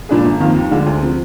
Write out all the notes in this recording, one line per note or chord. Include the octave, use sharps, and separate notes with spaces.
A#2 G#3 D4 G#4
G1
F2 D#3 A#3 F4
D#2
D3 G#3 D4 F4
D2
C3 F3